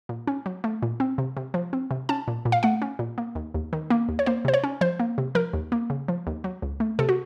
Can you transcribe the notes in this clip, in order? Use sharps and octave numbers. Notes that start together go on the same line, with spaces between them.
A#2
C#4
F#3
A3
A#2
C4
C3
C3
F3
C4
C3
C#4 A5
A#2
A#2
F5
A3 F#5
C#4
A#2
A#3
D#2
D#2
D#3
A#3
D#2
C#5
A#3 C5
C3 C5
C#5
C#4
F3 C5
A#3
C3
F3 A#4
D#2
A#3
C#3
F3
D#2
F#3
C#2
A3
C3 A4
F#4